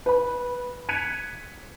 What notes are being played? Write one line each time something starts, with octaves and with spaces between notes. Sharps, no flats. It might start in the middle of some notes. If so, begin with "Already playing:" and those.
B4 B5
F#6 G#6 B6 C#7 D#7 F7